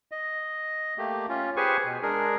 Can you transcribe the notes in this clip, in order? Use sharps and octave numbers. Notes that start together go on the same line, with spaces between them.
D#5
A3 A#3 G4
C#4 F4
G4 G#4 B4 C5 G#5 C#6
B2
G#3 D4 G#4 A#4